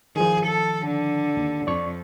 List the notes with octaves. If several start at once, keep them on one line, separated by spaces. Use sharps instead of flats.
D#3 F3 G#4
A4
D3
D#2
F2 D5 C#6